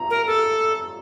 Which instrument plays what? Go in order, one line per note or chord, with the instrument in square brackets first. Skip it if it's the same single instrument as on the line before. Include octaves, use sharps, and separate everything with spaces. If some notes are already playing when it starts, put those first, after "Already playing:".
Already playing: [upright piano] A#5
[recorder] A#4
A4